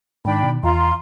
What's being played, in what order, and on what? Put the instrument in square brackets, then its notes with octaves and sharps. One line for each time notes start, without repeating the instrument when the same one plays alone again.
[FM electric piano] G#2 D#3 [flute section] D4 G5 B5
[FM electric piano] B2 D#3
[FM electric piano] E2 [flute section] F4 A#5 C6